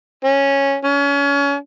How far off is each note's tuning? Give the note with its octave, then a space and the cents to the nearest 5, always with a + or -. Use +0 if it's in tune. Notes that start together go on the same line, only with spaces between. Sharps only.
C#4 -5
C#4 +30